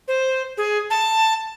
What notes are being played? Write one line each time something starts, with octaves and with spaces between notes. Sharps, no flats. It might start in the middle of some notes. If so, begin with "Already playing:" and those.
C5
G#4
A5